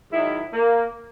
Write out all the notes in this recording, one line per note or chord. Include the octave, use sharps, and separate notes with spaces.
G#2 D#3 F#3 E4
A#3